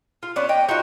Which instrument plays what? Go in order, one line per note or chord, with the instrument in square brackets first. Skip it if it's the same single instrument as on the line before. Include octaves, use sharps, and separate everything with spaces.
[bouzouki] F4
B3 C#4 D4
D#5 G5
D#4 F4 F#4